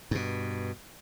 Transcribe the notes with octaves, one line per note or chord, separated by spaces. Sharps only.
G2 B2